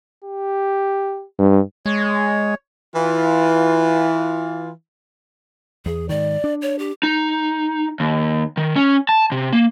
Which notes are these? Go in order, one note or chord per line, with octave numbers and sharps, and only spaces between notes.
G4
G2
G#3 C#5
E3 F4
E2 G#4
G#2 D#3 D5
D4
C#5
G4
D#4
D#2
D#3
C#4
A5
C3
A#3